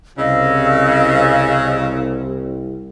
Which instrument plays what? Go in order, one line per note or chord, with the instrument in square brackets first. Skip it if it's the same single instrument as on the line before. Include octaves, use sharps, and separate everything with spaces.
[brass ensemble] C2 [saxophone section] C#3 [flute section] D#5 F5 E6